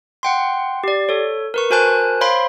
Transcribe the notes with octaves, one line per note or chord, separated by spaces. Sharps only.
F#5 G5 C6
G4 D5
A4 C#5
A#4 B4 C#6
F#4 A#4 C5 G#5 A5 F#6
C5 C#5 F5 B5 C6